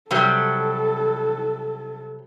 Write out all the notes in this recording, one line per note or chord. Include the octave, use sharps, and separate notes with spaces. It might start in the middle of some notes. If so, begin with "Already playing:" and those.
C3 F#3 G3 A4